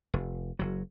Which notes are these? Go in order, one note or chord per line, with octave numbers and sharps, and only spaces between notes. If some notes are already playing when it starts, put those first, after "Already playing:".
F1
F#1 F#3